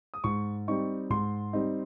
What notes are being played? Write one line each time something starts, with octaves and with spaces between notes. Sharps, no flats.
D#6
G#2 C#6
G3 C4 D#4 C#6
G#2 C6
G3 C4 D#4